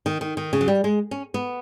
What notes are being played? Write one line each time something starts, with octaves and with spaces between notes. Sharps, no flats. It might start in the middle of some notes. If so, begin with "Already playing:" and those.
D#3
D#3
D#3
C#3
F#3
G3
G#3
C#4
B3